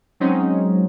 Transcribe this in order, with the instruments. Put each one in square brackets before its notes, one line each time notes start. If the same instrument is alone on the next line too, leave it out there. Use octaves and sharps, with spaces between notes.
[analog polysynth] F#3 G#3 C4 C#4 D#4